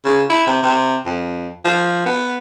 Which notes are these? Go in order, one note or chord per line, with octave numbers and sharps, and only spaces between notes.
C#3
E4
C3
C3
F2
F3
B3